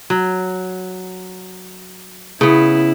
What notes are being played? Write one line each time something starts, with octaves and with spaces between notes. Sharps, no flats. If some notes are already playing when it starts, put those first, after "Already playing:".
F#3
C#3 B3 E4